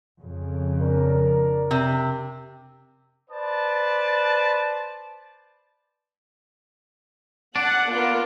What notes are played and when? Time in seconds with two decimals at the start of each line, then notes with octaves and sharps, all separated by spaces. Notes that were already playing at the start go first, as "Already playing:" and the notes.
0.21 F2 C#3
0.80 D4 A#4
1.71 C3
3.30 B4 C5 D5 A5
7.56 D4 F#5 A5
7.92 A#3 B3 F4 A#4